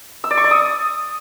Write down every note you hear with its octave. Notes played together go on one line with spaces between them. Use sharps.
E6
D5
C#6
D5
D#6